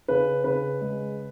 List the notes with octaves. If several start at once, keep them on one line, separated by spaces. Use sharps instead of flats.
C#3 B4
C#3 B4
G#3